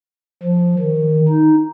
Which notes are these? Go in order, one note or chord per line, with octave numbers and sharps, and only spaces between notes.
F3
D#3
D#4